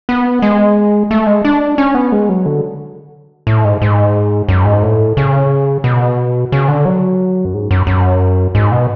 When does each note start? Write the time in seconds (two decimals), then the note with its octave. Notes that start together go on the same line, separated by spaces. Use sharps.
0.09 B3
0.42 G#3
1.11 A3
1.27 G#3
1.45 D4
1.78 C#4
1.95 B3
2.12 G#3
2.29 F#3
2.46 D3
3.47 A2
3.64 G#2
3.82 G#2
4.49 F#2
4.65 G#2
4.83 A2
5.17 C#3
5.84 B2
6.52 C#3
6.68 D3
6.85 F#3
7.45 F#2
7.54 G#2
7.71 F#2
7.87 F#2
8.55 G#2
8.72 B2